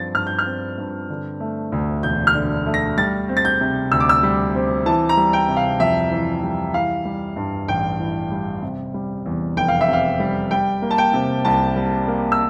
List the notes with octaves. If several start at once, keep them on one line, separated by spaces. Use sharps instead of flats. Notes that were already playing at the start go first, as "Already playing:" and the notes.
Already playing: G2 F3 C4 A6
G2 F6
G6
F6
C4
G2
D3
A3
D2
E1 G6
F6
D3
A3
A#6
G3 A6
C4
A6
G6
C3
D2 E6
D6
E6
G3
C4
E3 A5
A#5
G3
G5
C3
F5
F2 E5
E3
G3
E3 F5
G3
G2
A1 G5
E3
G3
C3
G3
E2
F1 G5
F5
E5
C3 F5
G3
G3 G5
A#3
A5
G5
C3
C2 A5
G3
A#3
E6